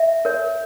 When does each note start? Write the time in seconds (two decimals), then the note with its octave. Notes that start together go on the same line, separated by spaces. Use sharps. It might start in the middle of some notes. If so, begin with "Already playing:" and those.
Already playing: E5
0.25 A#4 C#5